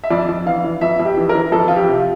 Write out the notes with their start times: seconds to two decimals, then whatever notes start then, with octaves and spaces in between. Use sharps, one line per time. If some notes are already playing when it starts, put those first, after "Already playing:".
0.04 E5
0.11 F2 D5
0.29 F2
0.46 E3 F5
0.64 E3
0.81 F2 E5
1.00 F2
1.05 G4
1.17 E3
1.29 A#4
1.35 E3
1.52 F2 A4
1.68 F3 F4
1.76 G4
1.88 C3
2.00 F4